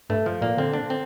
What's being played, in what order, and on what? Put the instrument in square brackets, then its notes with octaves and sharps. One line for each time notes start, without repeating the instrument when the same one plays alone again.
[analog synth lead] G2 [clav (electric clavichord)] A3
[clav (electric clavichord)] F3
[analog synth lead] A#2 [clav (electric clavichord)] A#3
[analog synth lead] D3 [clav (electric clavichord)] C4
[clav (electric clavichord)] D4
C4